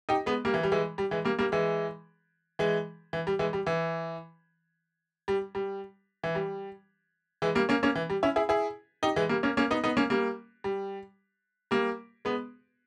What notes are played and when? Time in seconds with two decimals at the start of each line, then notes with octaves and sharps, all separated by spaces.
0.09 D#4 G4
0.26 G#3 B3
0.45 G3 A#3
0.54 E3
0.63 G3
0.72 E3 G#3
0.98 G3
1.11 E3 G#3
1.25 G3 A#3
1.39 G3 A#3
1.52 E3 G#3
2.59 E3 G#3
3.13 E3
3.27 G3
3.39 E3 G#3
3.53 G3
3.67 E3
5.28 G3
5.55 G3
6.24 E3
6.35 G3
7.42 E3 G#3
7.55 G3 A#3
7.69 A#3 C#4
7.83 A#3 C#4
7.95 E3
8.10 G3
8.23 C#4 E4
8.36 E4 G#4
8.49 E4 G#4
9.03 D#4 G4
9.16 E3 G#3
9.29 G3 A#3
9.43 A#3 C#4
9.57 A#3 C#4
9.70 B3 D#4
9.84 B3 D#4
9.97 A#3 C#4
10.10 G3 A#3
10.64 G3
11.71 G3 A#3
12.25 G#3 B3